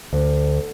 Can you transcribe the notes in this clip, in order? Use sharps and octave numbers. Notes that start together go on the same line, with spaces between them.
D2